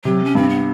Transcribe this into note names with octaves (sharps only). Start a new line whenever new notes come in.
C3 F#3
C#4
G2 C4
B3